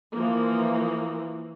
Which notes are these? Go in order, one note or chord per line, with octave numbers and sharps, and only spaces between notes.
E3 F3 A#3